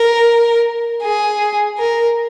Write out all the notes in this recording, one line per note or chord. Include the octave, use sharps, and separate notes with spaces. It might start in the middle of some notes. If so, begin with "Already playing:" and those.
Already playing: A#4
G#4
A#4